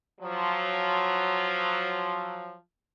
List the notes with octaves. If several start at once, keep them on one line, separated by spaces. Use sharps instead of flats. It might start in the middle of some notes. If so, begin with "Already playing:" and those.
F3 F#3